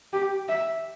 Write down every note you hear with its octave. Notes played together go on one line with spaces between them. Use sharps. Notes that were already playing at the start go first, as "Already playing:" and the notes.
G4
E5